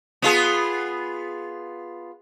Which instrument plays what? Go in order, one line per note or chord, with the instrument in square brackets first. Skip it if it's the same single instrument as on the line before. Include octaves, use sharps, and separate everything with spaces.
[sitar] B3 F4 G#4